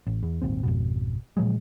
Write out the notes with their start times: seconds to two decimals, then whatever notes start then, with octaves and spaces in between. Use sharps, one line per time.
0.07 A1
0.23 E2
0.42 D#1 G#1 D#2 C4
0.63 G#1 F2 B2
1.37 A#2 F3 F#3 G#3